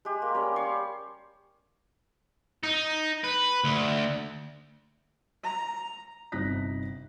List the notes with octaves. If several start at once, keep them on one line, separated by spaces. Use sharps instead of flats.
G#3 G4
A#3
G3 C#4
C#5 C6 C#6
D#4
B4
D2
A#5
G1 C3 D#4 F#6 A#6 B6